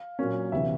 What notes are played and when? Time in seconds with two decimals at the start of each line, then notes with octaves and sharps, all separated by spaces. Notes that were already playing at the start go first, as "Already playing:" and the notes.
Already playing: F5
0.19 A#2 F#3 A#3 C#4
0.52 D2 C3 E3 E5